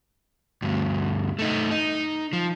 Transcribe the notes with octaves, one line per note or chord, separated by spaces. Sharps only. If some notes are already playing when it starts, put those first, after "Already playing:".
D2 G2
A3 D#4
D#4
F3